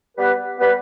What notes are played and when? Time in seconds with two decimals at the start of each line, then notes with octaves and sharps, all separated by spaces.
0.17 G3 B3 G4 B4
0.58 G3 B3 G4 B4